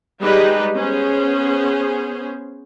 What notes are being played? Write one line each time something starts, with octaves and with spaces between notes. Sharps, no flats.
G3 G#3 D#4 G4 G#4 B4
B3 C#4 G#4 C5